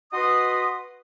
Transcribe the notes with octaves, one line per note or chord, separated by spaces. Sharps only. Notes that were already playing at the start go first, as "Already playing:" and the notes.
F#4 B4 D#5 C6 D#6